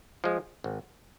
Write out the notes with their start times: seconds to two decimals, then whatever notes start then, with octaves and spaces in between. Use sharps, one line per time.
0.24 F3 G#3
0.64 G#1